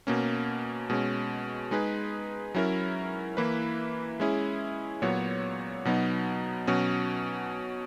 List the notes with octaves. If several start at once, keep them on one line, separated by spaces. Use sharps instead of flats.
B2 A#3 C#4
B2 G#3 C#4
G#3 D#4 G#4 B4
F#3 C#4 E4 A#4
E3 A#3 E4 B4
G#3 C#4 E4 G#4
A#2 F#3 B3 F#4 C#5
B2 F#3 B3 D#4
B2 F#3 C#4 F#4